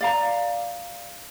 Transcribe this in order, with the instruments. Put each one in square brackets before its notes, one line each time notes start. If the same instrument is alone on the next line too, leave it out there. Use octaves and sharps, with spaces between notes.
[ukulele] D5 F5 A#5